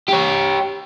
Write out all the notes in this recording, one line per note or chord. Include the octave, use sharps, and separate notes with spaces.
G4 C#5